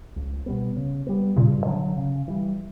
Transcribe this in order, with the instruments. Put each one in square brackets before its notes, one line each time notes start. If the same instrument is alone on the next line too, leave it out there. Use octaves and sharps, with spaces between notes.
[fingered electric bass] C#2
B2 G3 B3
C#3
G3 B3
[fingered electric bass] G2 [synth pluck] A#2 C#3
[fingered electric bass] D3 F#3
C#3
E3 G3